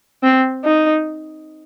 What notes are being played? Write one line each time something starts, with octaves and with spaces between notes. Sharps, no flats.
C4
D#4